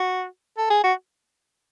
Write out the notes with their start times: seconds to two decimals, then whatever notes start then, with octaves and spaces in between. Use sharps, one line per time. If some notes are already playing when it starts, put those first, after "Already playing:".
Already playing: F#4
0.58 A4
0.71 G#4
0.84 F#4